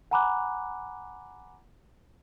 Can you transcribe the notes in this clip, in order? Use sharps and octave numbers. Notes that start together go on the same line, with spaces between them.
F#5 G#5 A#5 B5 D6 F#6